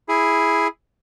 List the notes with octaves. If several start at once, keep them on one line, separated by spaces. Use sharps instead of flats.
E4 G#4